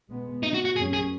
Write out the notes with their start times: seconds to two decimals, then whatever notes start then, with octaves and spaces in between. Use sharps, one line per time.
0.09 B2 G#3 B3
0.43 D#4
0.54 F#4
0.65 F#4
0.76 F#2 F#3 C#4 G#4
0.93 G#4